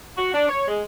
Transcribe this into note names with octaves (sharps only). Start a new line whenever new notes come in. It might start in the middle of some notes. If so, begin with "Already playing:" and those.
F#4
D4
C#5
G#3